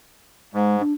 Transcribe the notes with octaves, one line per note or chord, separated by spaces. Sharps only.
G#2 G#3
D4